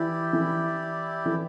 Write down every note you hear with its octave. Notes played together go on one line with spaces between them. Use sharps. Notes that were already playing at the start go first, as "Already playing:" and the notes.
Already playing: E3 E4 G4 D5
E3
E3